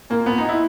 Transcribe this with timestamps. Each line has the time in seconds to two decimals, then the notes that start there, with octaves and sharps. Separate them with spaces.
0.10 A#2 A#3
0.26 A#2 B3
0.38 D#4
0.44 A#2 E4